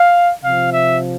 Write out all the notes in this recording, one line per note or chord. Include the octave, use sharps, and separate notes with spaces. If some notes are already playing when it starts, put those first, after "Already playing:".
Already playing: F5
C3 F3 F5
E5